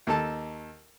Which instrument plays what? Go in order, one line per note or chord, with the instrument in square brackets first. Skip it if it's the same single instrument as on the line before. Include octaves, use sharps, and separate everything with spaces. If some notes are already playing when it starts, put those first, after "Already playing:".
[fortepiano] D#2 A4 A5